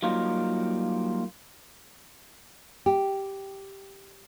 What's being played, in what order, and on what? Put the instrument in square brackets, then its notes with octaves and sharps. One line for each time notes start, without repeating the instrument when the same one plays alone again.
[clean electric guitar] F#3 G3 A#3 D#4 F4
[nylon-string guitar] G4